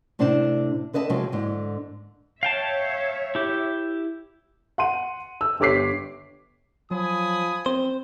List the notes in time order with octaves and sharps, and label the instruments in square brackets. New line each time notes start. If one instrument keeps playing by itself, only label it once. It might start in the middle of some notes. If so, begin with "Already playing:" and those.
[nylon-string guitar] A2 C3 D4 C5 D5 A5
D3 B4 D#5 E5 A5
C3 F3 F#3 G#3 C4
G#2 D3
[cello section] C#5 E5 [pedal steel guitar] F5 G5 A5
[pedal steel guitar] E4 G4
[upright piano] F#5 C6 D#7
E6
G1 G4 C#5 D6 B6 C7
[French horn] F3 [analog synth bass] F#3 [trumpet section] G#5 B5 D#6
[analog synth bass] C4 [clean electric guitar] C5